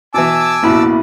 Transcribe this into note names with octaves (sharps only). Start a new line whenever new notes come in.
B2 E3 G#5 A5 D6 E6
A1 E2 B2 A#3 E4 B5